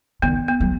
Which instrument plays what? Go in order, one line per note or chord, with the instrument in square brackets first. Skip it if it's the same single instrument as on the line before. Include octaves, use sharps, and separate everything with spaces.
[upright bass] D#3 [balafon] B3
[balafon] B3
[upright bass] F#3